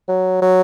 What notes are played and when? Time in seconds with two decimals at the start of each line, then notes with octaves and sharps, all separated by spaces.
0.08 F#3
0.41 F#3